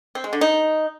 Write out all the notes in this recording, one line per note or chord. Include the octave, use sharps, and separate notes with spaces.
C4
G#3
D3
D#4